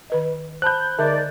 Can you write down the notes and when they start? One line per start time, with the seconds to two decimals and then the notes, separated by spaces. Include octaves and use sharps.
0.10 D#3 B4 D#5
0.62 C5 A5 B5 F#6 G6
0.99 D3 G#3 D#4 A#4 D5 E5